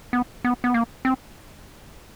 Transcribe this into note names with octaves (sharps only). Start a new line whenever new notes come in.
B3
B3
B3
A#3
C4